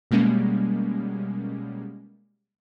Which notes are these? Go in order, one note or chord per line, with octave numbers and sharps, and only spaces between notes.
B2 G3 G#3 A#3 C#4